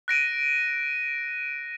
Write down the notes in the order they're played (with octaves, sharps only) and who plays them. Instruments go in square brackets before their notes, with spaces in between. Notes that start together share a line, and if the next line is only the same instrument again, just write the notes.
[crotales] F#6 A#6 D7 D#7